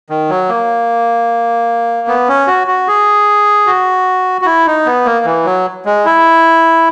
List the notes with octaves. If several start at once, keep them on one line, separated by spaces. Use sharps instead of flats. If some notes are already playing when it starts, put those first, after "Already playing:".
D#3
F#3
A#3
B3
C#4
F#4
F#4
G#4
F#4
F#4
E4
D#4
B3
A#3
E3
F#3
G#3
E4